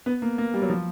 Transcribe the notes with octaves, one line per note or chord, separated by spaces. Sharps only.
B3
A#3
A#3
G3
F#3
F3